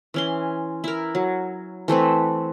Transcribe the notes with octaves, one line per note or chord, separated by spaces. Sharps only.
E3 C#4 C6
E4 A#4
F#3
E3 A3 C4 B4